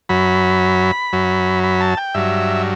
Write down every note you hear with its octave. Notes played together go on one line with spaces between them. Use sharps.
F#2 F#3 B5
F#2 F#3
B5
A5
G5
G2 F#3 E5